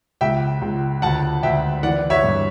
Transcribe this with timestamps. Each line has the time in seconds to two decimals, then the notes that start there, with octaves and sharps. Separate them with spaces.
0.21 C#2 E5 G5
0.62 C#2
1.02 D2 F#5 A5
1.43 D2 E5 G5
1.83 E3 D5 F#5
2.10 C#5 E5
2.24 G2